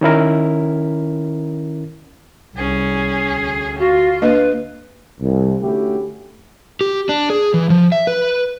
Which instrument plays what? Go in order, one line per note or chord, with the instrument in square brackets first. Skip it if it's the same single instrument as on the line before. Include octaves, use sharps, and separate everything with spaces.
[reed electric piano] D#3 C#4 E4 A#4
[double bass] C2 [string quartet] C#4 G#4
[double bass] D2
[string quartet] F4 [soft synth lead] F#4
[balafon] A#3 D4 D#5 [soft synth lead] B4
[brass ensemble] C2
D3 A3 C#4 E4 F#4 G4
[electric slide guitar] G4
D4
G#4
E3
F3
E5
B4